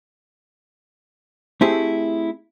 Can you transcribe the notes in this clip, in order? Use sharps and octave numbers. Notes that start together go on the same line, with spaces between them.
A3 C4 E4 G4 G#4